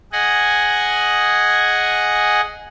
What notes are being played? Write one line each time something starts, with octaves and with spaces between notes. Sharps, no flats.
G#4 D#5 F#5 G#5